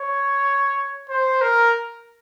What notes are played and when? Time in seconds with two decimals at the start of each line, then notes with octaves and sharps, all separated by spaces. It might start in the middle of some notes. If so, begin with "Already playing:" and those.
Already playing: C#5
1.09 C5
1.41 A#4